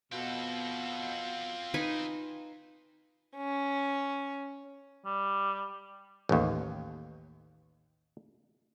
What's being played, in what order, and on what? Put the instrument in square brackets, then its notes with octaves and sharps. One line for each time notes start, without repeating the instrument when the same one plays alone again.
[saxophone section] B2 [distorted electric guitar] C4 A4 [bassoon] F4
[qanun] D#4 B4 G#5
[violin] C#4
[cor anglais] G3
[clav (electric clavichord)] A1 D#2